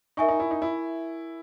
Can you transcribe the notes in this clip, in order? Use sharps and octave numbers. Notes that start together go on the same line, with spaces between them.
D#4 A#4 E5 G#5 C#6
D#4
E4
D#4
E4